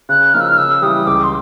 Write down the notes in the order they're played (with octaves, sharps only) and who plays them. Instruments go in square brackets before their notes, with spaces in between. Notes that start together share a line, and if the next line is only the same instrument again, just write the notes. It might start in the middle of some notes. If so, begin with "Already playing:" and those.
[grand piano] C#3 [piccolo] F#6
[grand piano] F3 A#3 D#4 [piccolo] F6
[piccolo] E6
F6
[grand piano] C#3 [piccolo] E6
[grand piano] E3 G3 [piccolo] D#6
[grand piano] C#2 [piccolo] D6
[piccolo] C6